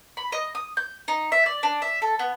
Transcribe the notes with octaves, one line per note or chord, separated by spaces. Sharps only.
B5
D#5
D#6
G6
D#4
E5
D5
D4
E5
A4
B3